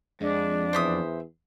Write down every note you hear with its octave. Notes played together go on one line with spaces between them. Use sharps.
F2 G#3 D4
E2 C5 E5 D#6